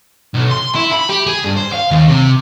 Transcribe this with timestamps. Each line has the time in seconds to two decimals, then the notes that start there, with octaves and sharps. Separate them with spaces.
0.34 B1
0.50 C6
0.75 E4
0.92 B5
1.09 G4
1.27 G#4
1.45 G2
1.57 C5
1.73 F5
1.91 D#2
2.08 C3